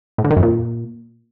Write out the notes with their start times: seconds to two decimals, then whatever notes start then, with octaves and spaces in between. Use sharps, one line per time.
0.18 A2
0.24 D3
0.30 D#3
0.37 F#2
0.43 A#2